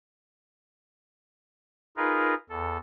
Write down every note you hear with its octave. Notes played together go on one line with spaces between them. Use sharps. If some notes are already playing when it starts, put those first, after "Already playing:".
D#4 F4 G#4 A#4 B4
E2 A4